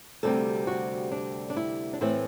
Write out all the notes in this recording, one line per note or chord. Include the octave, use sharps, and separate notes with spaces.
D2 C3 G3 C4 A4
F#4
D4
D4
E4
D4
A2 E3 A3 C4 E4